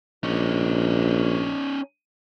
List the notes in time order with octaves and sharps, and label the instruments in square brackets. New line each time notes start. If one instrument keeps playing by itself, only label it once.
[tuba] A#1 [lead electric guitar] C#4 D#4